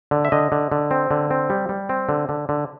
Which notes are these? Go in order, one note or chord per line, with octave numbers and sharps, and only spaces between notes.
D3
E5
D3 D#5
D3
D3
C4
D3
C4
G3
G3
C4
D3
D3
D3